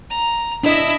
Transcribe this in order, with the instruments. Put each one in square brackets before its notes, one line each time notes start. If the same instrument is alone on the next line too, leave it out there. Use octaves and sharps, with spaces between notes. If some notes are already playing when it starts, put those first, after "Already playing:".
[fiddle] A#5
[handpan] D4 D#5 [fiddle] E4 E5